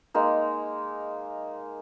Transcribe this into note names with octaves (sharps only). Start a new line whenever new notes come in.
G#3 A#3 D#4